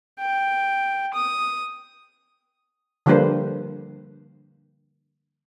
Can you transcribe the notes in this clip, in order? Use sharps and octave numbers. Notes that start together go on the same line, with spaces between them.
G5
D#6
D3 F3 G3 A#3 B4 C5